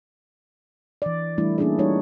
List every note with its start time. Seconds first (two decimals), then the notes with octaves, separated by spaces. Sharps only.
1.02 E3 D5
1.38 E3 G3 A3 D4 E4
1.58 A#3 C#4 D4 E4 G#4 D5
1.78 G3 D#4 F4 G4 C#5